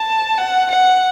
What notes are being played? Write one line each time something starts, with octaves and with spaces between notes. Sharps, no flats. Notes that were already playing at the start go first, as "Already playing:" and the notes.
Already playing: A5
F#5
F#5